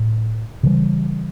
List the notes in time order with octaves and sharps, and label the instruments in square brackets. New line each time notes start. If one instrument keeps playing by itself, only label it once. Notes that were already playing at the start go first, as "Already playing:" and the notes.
Already playing: [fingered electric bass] A2
C#3 E3 G3